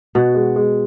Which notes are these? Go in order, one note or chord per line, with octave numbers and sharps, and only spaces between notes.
B2 F#4
G#3
G#3